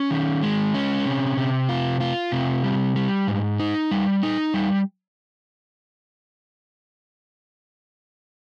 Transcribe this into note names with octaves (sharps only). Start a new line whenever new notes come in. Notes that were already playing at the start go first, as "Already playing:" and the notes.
Already playing: C#4
D#3
G#3
C#4
C3
C3
F4
F4
C3
G3
G3
G#2
D#4
G3
D#4
G3